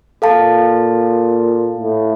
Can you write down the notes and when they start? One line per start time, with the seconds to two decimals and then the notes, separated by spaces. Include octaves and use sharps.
0.22 A#2 A4 F5 A5
1.78 A2